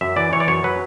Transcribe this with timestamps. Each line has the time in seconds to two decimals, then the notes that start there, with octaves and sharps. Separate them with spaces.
0.01 F#2 E5
0.17 E3 D5
0.33 E3 C#5
0.40 D5
0.48 F#2 C#5
0.64 F#3 B4